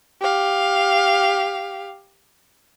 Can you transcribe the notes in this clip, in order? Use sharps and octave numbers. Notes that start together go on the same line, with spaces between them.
G4 F5